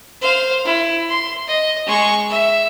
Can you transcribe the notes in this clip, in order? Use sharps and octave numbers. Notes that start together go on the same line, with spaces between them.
C5 F5
E4
C6
D#5
G#3 C#6
E5